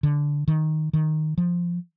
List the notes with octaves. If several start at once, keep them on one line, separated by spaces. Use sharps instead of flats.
D3
D#3
D#3
F3